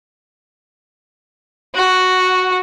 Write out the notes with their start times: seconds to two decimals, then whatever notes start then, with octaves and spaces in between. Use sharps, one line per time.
1.75 F#4